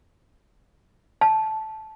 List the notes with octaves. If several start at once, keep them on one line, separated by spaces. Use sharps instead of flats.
A5